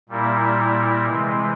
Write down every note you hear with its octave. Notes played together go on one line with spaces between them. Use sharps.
A#2 G3 A#3 E4 A#4
C3 E3 G#3 C4